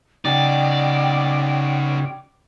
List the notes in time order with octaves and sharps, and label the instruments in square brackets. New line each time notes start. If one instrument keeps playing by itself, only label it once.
[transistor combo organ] C#3 [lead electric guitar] D#4 F#4 [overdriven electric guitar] D5 [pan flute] G5